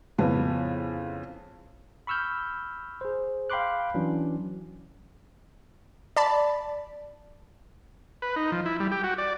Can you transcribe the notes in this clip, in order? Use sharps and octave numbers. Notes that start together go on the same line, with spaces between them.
F2 A2 C#3 B3
B5 C#6 E6 F6 G6
G#4 C5
F5 G5 B5 C6 D6 F#6
E3 F#3 C#4 D4
D5 A5 B5
B4
D#4
F3
E4
G3
G4
F#4
D5